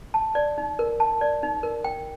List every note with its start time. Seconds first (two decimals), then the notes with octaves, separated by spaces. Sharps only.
0.14 A5
0.35 D5
0.58 D#4
0.79 A#4
1.00 A5
1.21 D5
1.43 D#4
1.63 A#4
1.84 G5